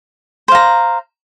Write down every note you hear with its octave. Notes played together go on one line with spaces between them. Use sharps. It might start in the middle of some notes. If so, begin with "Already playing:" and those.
C5 F5 A#5